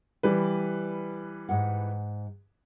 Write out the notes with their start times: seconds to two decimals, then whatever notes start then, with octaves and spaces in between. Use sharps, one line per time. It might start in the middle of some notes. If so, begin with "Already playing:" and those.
0.23 E3 G3 B4
1.49 G#2 F#5